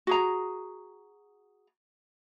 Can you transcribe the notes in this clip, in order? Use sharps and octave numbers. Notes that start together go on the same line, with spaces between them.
F#4 G#4 A#5